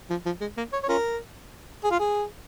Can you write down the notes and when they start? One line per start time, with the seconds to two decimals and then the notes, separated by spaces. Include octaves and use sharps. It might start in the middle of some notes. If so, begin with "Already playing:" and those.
0.10 F3
0.26 F3
0.41 G#3
0.57 A#3
0.73 C#5
0.83 C#5
0.89 C#4 F4 A#4
1.84 G#4
1.91 F4
1.99 G#4